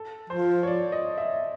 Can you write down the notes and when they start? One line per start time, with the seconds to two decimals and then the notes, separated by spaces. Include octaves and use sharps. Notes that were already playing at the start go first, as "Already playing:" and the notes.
Already playing: A4
0.30 F3 C5
0.63 C#5
0.67 D5
0.92 D#5
1.18 E5